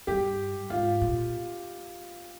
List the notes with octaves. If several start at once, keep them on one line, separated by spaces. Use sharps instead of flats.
G2 G4
G#2 F4
A#2